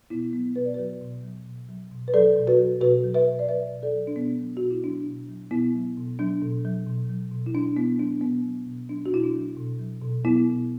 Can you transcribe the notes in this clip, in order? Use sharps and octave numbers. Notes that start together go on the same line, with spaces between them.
B2 B3 E4
F#3 B3
B2 B4
D5
F#3 F#4 B4
B2
F#3
B2
F#3
B2
B4
F#3 A4 D5
B2
F#4 B4
F#3
B2 F#4 B4
F#3
B4 E5
B2
D5
F#3 B4 E5
B2
A4 D5
F#3
D4
B2 B3
F#3
B2 F#4
E4
F#3 D4
B2
F#3
B2 B3 E4
F#3
B2
F#3 D4
B2
F#3
B2
F#3
B2
E4
F#3 D4
B2 B3 E4
F#3 D4
B2 B3
F#3
B2
F#3 D4
F#4
B2 E4
D4
F#3
B2
F#3
B2
F#3 B3 E4
B2